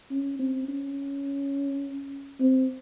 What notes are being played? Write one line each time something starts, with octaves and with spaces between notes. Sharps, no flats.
C#4
C4
C#4
C4